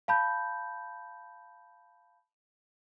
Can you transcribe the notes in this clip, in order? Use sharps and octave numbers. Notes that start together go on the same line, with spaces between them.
F5 A5 B5 G6